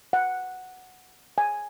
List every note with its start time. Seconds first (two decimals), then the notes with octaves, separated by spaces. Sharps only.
0.13 F#5
1.38 G#5